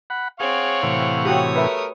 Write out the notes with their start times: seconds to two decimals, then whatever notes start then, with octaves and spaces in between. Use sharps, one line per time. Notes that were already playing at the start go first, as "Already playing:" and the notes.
0.10 F#5 B5
0.40 C4 G#4 C#5 F5 F#5 C#6
0.83 A2 C3 E3
1.25 F#4 G4 C#5 D#6
1.56 A3 A#4 B4 E5